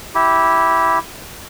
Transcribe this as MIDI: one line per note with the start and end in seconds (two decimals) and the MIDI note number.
0.15 0.99 64
0.15 0.99 67